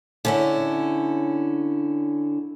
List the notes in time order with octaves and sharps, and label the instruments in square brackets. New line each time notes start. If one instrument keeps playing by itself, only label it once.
[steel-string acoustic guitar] D3 C#4 E4